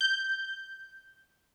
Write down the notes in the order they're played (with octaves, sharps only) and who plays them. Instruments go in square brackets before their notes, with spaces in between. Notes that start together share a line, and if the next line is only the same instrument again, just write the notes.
[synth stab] G6